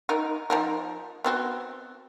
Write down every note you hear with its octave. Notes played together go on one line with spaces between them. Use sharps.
D#4 A#4
F3 D#4 A#4
B3 C4 F#4